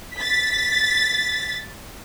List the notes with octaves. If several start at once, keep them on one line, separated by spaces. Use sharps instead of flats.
A6 B6